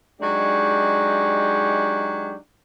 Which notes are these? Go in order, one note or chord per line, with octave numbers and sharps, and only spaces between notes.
F#3 G#3 D4 D#4 G4